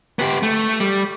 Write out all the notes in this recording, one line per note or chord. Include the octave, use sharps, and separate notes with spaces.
B3 G4
A3
G3